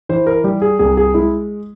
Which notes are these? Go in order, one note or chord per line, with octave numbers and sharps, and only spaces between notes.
E3 C5
A#4
G3 G4
G#4
C2 G#4
G#4
G#3 E4